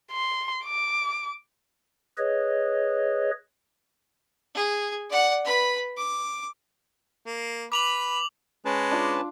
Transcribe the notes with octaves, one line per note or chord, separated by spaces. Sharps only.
C6
D6
G#4 B4 C#5 D#5
G#4
D5 F#5
B4 B5
D6
A#3
B4 B5 D6 F7 F#7
G#3 C#4 B4 A5
D4 F4 D5